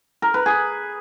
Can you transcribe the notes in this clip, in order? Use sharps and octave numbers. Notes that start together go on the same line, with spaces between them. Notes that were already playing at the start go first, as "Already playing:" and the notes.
A#4
B4
G#4